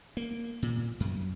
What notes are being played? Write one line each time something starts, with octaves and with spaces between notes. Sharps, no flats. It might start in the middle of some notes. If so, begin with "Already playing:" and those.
A#3
A#2
F#2